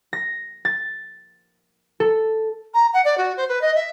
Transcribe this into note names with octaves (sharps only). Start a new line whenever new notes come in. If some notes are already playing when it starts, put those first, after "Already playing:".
A#6
A6
A4
A#5
F#5
D5
F#4
C5
B4
D#5
E5